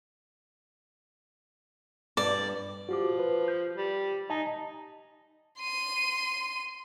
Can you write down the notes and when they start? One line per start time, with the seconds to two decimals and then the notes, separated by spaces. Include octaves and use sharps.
2.17 G2 D5
2.89 F3 F#4 G4 D6
3.19 B4
3.48 G6
3.77 G3
4.30 D#4 D#5 G#5 A5
5.59 C6 D#7